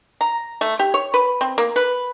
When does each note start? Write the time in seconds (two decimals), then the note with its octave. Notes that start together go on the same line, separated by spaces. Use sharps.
0.21 A#5
0.61 A3
0.79 G4
0.94 C#5
1.14 B4
1.41 C4
1.58 A#3
1.76 B4